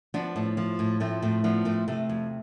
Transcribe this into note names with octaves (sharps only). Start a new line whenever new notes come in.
F3 B3 D4
A2
F3
A2
F3 A3 C4
A2 A3 C4
F3 B3 D4
A2 A3 C4
C3 A3
F2